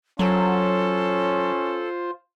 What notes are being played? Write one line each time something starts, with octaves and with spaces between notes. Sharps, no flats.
F#3 C#4 F4 A4 C5